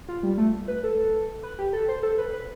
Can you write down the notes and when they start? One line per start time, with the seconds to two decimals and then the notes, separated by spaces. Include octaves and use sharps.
0.09 F4
0.23 G3
0.38 A3
0.68 B4
0.83 A4
1.43 B4
1.59 G4
1.73 A4
1.89 C5
2.03 A4
2.18 B4
2.33 B4